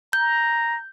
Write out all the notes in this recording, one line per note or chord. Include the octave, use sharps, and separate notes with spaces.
A#5 G6